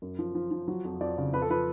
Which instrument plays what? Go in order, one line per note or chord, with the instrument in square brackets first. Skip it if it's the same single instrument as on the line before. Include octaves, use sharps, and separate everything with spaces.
[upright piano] F#2
F3
F3
F3
F#3
F2
F2 D5
C#3
F2 B4
A4
F3 B4